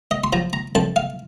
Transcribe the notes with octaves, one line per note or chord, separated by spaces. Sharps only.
D#5
C6
F3 A#5
A#5
F2 A5
F5